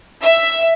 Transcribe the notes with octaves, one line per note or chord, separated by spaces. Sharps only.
E5